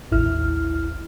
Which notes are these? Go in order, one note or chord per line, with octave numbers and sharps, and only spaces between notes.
A1 D#2 E4 F6